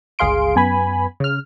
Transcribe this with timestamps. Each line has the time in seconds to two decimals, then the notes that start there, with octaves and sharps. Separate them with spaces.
0.19 G1 C#2 G#4 F5 C6 D7
0.55 F#2 B3 G#5 B5
1.20 C#3 F6